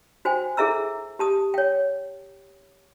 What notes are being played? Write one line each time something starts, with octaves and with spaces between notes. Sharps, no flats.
F#4 C5 G5 G#5
E4 G#4 A4 E5 A#5 E6
G4 A5 D#6
C#5 G5